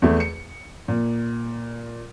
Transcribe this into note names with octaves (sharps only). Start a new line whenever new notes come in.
E2 A3
C#7
A#2